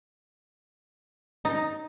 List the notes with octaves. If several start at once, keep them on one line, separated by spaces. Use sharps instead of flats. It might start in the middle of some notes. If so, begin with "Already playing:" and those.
D#4